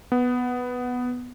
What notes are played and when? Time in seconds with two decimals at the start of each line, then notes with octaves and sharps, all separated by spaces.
0.12 B3